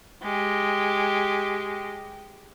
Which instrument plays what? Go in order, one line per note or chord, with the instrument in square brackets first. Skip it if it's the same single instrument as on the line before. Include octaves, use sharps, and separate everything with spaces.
[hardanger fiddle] G#3 G4